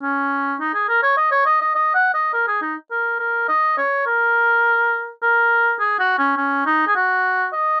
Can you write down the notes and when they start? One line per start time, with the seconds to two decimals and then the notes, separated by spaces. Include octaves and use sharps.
0.02 C#4
0.60 D#4
0.74 G#4
0.89 A#4
1.03 C#5
1.17 D#5
1.32 C#5
1.46 D#5
1.61 D#5
1.75 D#5
1.95 F#5
2.14 D#5
2.33 A#4
2.47 G#4
2.62 D#4
2.91 A#4
3.19 A#4
3.48 D#5
3.78 C#5
4.06 A#4
5.23 A#4
5.80 G#4
5.99 F#4
6.19 C#4
6.37 C#4
6.66 D#4
6.87 G#4
6.96 F#4
7.53 D#5